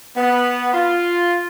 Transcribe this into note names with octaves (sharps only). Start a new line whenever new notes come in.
B3
F4